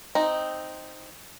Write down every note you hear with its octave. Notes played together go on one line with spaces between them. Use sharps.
C4 D#4